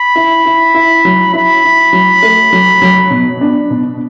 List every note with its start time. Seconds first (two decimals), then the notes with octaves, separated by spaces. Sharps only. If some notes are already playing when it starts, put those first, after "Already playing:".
Already playing: B5
0.15 E4
0.46 E4
0.74 E4
1.05 F#3
1.33 E4 B5
1.64 E4
1.93 F#3
2.23 A3
2.52 F#3
2.82 F#3
3.11 B2
3.41 D4
3.70 B2